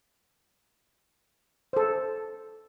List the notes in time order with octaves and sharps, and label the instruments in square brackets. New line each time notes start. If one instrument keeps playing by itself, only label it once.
[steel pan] A4 C5